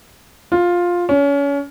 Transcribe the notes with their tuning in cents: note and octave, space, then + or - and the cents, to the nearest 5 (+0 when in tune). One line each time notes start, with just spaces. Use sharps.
F4 +10
C#4 +30